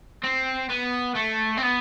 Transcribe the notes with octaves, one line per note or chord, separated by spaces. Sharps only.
C4
B3
A3
C4
B3